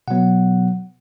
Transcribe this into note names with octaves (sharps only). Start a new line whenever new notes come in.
B2 F#3 B3 F#5